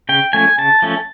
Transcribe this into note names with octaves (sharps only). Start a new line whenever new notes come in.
C#3 G5
F3 A3 C#4 G#5
C#3 A5
F3 A3 C#4